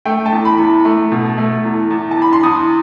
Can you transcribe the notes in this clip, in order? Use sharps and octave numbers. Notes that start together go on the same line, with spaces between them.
A3 G5
A5
E2
B5
E2
A3
B2
A3
E2
E2
A5
E2 B5
C6
E2 D#6